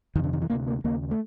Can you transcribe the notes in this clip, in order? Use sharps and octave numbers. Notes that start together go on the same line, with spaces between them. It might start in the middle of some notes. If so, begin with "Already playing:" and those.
F2 C3 D#3
D3
D#3
E3
D2 C3 A#3
A#3
D#2 C#3 A#3
A3